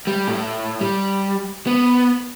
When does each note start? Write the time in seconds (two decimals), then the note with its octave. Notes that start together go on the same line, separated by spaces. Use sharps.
0.07 G3
0.28 A2
0.81 G3
1.67 B3